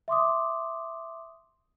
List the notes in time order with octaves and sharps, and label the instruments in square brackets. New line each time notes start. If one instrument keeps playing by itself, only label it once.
[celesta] E5 C6 D6 D#6